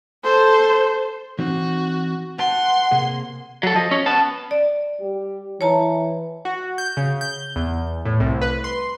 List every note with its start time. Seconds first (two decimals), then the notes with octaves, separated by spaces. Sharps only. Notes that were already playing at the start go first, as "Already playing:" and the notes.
0.24 A4 C5
1.39 E3 C4 D#4 F#4
2.39 B4 F#5 G5 A5 C6
2.91 C3 A#3 G#4
3.63 F#3 A4
3.75 F3 D#5
3.91 C#4 C#5
4.06 B3 A5
4.51 D5
5.00 G3 G4
5.61 E3 C#5 A5 A#5
6.45 F#4
6.78 G6
6.97 C#3
7.21 G6
7.56 E2
8.05 A2
8.20 C2
8.42 B4
8.64 C6